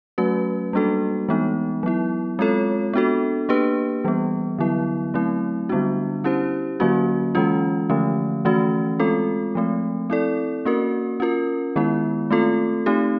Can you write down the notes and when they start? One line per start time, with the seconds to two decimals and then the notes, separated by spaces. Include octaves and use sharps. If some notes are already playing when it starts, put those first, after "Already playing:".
0.18 F#3 A3 C#4 F#4 B4
0.73 G3 A#3 D4 F#4 A4
1.29 E3 G#3 B3 D#4
1.83 F#3 B3 E4
2.39 G#3 C4 F4 A4 C#5
2.94 B3 D4 F#4 A4
3.49 A#3 D4 G4 B4
4.05 E3 G3 B3
4.59 D3 F#3 B3 E4
5.14 F#3 A3 C4 E4
5.69 D3 G3 B3 D4 F#4
6.24 C#4 E4 G4 C5
6.80 D3 F#3 A#3 C#4 F#4
7.35 E3 G#3 C#4 F4
7.90 D3 F3 A3 C#4
8.45 E3 A3 C#4 F#4
9.00 G#3 C4 F4 A4
9.55 F3 A3 C4
10.10 C4 E4 A4 D5
10.65 A#3 C#4 F#4 A#4
11.20 C#4 F4 A#4
11.76 D#3 G#3 B3 E4
12.31 A3 C4 F4 A4
12.86 A3 C4 D#4 G4